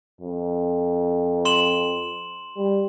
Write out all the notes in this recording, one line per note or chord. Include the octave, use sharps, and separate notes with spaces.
F2
C6 E7 F#7
G3